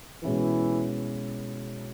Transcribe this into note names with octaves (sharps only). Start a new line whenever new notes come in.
B2 E3 G#3 C#4 E4